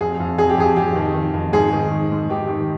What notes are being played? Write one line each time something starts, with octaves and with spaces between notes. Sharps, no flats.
F2 G#4
F2
F2 G#4
G4
F2 G#4
F2 G4
D#3
D#3
F2
G#2 G#4
D#3
D#3
G#2
D#3 G4
D#3